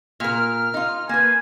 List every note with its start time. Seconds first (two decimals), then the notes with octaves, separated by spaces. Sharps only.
0.20 A#2 A#4 F6
0.74 D#4 F4
1.09 A#3 B4 G#5